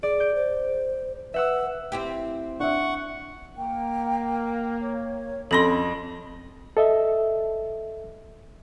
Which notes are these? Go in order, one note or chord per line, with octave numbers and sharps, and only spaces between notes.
G#4 D5
G6 D7
C5
B4 E5 F#5 E6
C4 E4 G4
D4 E5 F#5 C#6
A#3 G5
C#5
F2 C#4 A4 B5 C6 A#6
A4 D#5 E5